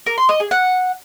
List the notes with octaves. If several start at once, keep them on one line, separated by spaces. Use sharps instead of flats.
A#4
C6
D#5
G#4
F#5